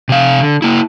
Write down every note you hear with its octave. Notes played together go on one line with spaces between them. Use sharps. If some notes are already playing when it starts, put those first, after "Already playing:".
C3 F5
D3
A#3 E4